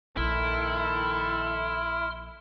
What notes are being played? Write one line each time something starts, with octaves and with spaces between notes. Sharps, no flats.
A#1 D#3 E4 A4 C6 F6